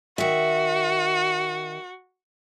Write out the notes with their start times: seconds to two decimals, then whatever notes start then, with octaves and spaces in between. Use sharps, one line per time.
0.18 D#3 F#4 E5